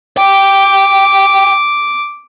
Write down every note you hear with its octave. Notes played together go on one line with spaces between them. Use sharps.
G5 D6